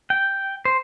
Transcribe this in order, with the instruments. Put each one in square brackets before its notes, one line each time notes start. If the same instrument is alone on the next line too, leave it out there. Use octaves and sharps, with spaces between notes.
[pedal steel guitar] G5
C5